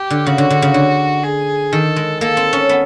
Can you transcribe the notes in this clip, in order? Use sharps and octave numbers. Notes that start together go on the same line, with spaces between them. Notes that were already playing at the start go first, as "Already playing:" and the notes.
Already playing: G4
D3
C#3 F#4
D3
D3
C#3
D3
G#4
D#3 A4
G#3
A#3 A4
C4
C#4
B3